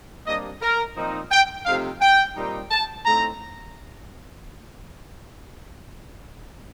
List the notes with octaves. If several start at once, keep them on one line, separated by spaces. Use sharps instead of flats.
C3 G3 A#3 D4 D#5
A#4
A#2 F3 C4 D#4
G5
C3 F3 A3 C4 D#4 F5
G5
A#2 G3 C4 D#4
A5
A2 A3 C4 D#4 A#5